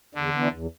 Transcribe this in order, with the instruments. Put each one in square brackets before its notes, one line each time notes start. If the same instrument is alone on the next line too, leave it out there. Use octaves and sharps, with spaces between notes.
[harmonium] E2 [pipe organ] D3
[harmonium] E3 B3 D4
E2